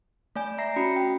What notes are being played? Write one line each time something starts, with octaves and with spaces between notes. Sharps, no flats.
A3 D5 G#5 G6
E5 A#5 A#6 C7
C#4 F#4 B5 C#7
G5